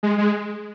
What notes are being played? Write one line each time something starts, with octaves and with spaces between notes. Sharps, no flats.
G#3
G#3